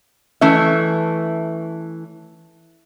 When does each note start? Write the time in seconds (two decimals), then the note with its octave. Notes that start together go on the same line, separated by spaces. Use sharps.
0.41 E3 A3 C#4 E5